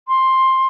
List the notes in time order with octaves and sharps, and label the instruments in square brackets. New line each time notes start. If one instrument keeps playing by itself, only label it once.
[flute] C6